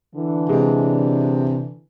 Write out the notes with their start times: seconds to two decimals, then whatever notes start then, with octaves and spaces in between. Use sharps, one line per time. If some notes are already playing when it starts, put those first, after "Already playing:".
0.15 D3 E3
0.49 C3 G#3